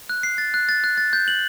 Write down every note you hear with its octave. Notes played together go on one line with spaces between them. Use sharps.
F#6
C7
A6
F#6
A6
F#6
A6
G6
F#7